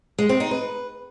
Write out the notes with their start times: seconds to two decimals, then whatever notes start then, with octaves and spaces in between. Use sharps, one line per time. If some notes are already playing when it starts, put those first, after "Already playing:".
0.18 G#3
0.29 C4
0.40 D#4
0.51 B4